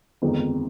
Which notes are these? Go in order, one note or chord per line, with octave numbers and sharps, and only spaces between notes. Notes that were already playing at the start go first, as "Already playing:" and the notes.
G1 F2 D#3 G#3 D#4